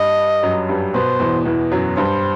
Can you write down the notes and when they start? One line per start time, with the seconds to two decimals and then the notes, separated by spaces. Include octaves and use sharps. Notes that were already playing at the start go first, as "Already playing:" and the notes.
Already playing: G2 G3 D#5
0.43 F#2 F#3
0.69 G2 G3
0.94 B2 B3 C5
1.20 E2 E3
1.46 E2 E3
1.72 F#2 F#3
1.97 G2 G3 C5